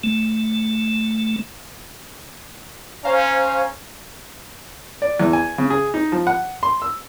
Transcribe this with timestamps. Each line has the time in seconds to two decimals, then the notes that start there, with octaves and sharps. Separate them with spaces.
0.04 A3
3.04 C#4 C5 F5 A#5
5.02 D5
5.20 E2
5.33 G#5
5.58 C#3
5.70 G#4
5.94 D#4
6.12 F3
6.27 F#5
6.63 C6
6.82 E6